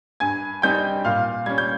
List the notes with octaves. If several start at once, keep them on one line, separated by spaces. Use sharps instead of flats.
G2 G#5 G#6
G3 C4 D#4 G5 G6
A#2 F5 F6
G3 C#4 G#6
G6